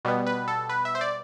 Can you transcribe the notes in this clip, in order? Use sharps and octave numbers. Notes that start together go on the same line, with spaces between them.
B2 G3 B3
B4
A4
B4
E5
C5
D5